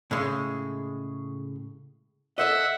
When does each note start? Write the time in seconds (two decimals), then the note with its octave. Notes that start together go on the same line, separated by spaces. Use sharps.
0.11 A2 C#3 G#3
2.38 A4 C5 D#5 E5 F#5